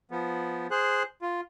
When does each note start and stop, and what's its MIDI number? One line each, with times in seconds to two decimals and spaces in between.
0.11 0.67 53
0.11 0.67 59
0.71 1.03 68
0.71 1.03 72
0.71 1.03 90
1.22 1.41 65